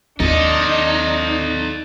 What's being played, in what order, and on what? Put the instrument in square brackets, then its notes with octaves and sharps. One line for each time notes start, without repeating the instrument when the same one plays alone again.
[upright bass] D#2 [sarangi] D4 [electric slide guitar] D#4 [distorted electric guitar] A4 D#5